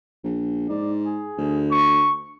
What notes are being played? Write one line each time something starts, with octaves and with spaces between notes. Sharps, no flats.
A#1
G#2 D5
G#4
D2
C#6